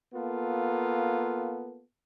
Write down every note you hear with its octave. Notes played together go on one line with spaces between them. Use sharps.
A#3 B3 F4 A4